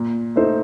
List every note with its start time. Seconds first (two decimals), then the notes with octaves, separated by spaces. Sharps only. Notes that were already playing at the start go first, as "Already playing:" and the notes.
Already playing: A#2
0.36 A3 D#4 A4 C5